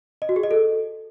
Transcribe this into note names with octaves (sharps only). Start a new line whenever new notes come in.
D#5
F#4
G#4
D#5
A4